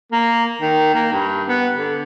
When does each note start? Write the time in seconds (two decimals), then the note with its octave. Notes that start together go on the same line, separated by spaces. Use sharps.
0.12 A#3
0.61 D#3
0.94 A#3
1.12 G2
1.48 B3
1.76 D3